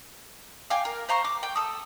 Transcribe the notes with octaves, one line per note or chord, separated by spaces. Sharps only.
F5 G5 G#5 D6
A#4
C5 F5 A#5 C#6
D6
G5
A4 D#6